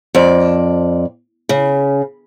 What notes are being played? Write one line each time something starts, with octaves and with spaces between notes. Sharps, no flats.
F2 D5
C#3